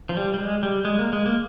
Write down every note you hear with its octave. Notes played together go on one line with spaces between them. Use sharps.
F3
G3
G3
G#3
G3
G#3
A#3
G#3
A#3